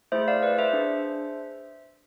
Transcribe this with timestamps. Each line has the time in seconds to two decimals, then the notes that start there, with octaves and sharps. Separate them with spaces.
0.12 A3 E4 G#4 C5 E5
0.28 D5 F5
0.43 B4 D5
0.58 C5 E5
0.73 D4 G#4